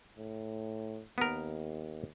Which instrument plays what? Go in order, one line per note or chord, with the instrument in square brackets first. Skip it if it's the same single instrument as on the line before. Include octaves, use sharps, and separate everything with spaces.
[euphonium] A2
[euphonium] D#2 [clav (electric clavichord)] B3 A#4